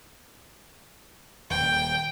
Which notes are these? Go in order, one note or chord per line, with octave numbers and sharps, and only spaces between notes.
D#1 G5